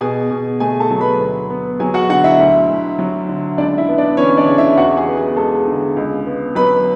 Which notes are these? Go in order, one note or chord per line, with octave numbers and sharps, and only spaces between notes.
B2 G#4 G#5
B2
A3 G#4 G#5
A4 A5
F#3
B4 B5
D2
B3
F#3 G#4 G#5
F#4 F#5
D3 F#4 F#5
E4 E5
D2
D2
F#3
D3
C#2 D4 D5
E4 E5
B3
D4 D5
E3 C#4 C#5
D4 D5
C#3
E4 E5
E2 F#4 F#5
G#4 G#5
B3
G#4 G#5
G#3 A4 A5
D3
C#2
B3
F#3 B4 B5